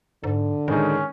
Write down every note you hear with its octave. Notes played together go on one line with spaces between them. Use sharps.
G#2 D3
A2 D#3 G#3 C#4 D#4